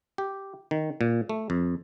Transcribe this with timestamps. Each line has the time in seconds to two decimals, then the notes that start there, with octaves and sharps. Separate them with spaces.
0.18 G4
0.71 D#3
1.01 A#2
1.29 A3
1.50 F2